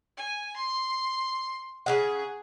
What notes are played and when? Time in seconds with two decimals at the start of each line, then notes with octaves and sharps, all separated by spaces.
0.17 G#5
0.57 C6
1.86 C#3 F#3 G#4 F#5